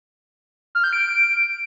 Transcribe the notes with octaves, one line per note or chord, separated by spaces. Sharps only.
F6
G6
D7